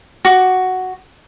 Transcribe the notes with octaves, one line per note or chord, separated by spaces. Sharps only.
F#4 D6